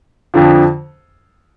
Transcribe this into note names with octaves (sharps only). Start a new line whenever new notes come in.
F2 D3 F3